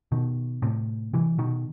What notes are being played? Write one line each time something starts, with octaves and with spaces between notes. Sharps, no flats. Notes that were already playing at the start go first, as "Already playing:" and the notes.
B2 D#3
A2 C3
C3 E3
B2 D#3